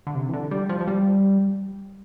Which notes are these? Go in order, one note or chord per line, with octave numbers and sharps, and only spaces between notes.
D3
C3
E3
D3
G3
F3
F3
G3